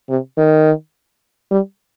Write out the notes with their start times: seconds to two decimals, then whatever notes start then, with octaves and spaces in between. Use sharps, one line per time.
0.09 C3
0.37 D#3
1.51 G3